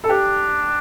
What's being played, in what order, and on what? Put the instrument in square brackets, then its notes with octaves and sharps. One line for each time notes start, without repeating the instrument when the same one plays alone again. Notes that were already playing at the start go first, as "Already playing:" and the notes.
[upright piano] A4
[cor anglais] D4 [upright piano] G4